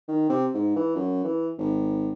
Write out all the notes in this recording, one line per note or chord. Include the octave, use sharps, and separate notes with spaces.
D#3
C3
G#2
E3
F#2
E3
G#1